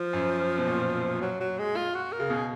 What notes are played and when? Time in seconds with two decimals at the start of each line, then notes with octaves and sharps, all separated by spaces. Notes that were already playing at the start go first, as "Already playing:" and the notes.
Already playing: F3
0.13 F#2
0.58 B2
0.67 A#2
1.22 F#3
1.40 F#3
1.59 G#3
1.76 F4
1.94 F#4
2.12 A#4
2.20 C#3
2.30 B2 G#4